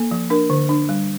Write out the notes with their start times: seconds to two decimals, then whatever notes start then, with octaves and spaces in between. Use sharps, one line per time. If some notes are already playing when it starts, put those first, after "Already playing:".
Already playing: A#3 A4
0.11 F3
0.30 D4 A#4
0.50 D3
0.69 D4
0.89 G3